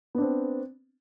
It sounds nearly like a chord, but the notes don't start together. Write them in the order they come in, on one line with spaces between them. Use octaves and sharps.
B3 D4 C4